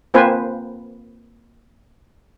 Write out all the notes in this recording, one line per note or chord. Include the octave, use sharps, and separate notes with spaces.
A#3 C4 F4 B4 C5 G#5